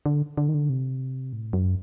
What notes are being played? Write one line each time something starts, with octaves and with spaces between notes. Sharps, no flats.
D3
D3
D#3
D3
C3
A2
F#2